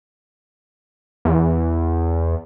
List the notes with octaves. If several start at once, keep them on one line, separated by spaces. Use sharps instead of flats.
E2